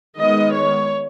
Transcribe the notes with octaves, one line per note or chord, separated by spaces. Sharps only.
D#3 G#3 B3 D#5
C#5